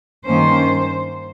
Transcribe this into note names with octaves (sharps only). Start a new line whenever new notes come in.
G2 D#3 A#3 C#4 C5